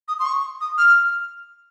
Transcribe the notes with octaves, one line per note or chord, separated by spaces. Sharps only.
D#6
C6
C#6
D#6
F6